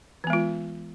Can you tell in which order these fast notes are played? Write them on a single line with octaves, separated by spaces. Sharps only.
E3 B3 G#3 F4